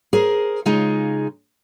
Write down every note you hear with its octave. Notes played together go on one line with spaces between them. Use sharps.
G#4 A#4 C5
C#3 G#3 D#4 F4 G#4